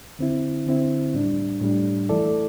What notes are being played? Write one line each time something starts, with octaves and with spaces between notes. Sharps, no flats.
D3 C4 E4
D3 C4 E4
A2 G3 D4
A2 G3 D4
E3 A3 E4 A4 D5